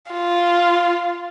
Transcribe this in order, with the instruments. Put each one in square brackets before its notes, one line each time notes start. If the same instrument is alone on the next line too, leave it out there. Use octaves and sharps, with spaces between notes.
[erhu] F4